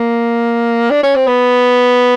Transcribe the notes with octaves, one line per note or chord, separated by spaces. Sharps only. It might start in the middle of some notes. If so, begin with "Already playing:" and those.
Already playing: A#3
D4
C#4
C4
B3